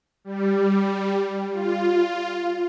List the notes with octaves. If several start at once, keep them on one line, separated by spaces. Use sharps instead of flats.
G3
F4